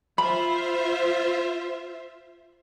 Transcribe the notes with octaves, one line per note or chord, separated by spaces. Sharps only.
F4 C5 E5 B5